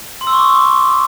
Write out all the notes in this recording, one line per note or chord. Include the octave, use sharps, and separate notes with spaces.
C6
E6
C#6
D6
C#6